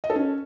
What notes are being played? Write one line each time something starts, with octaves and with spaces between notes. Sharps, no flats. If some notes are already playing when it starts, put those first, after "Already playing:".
D#5
A4
C#4